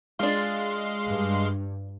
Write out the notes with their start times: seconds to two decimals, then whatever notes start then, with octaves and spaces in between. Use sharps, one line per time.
0.19 G#3 D4 F4 F5 C6
1.06 G2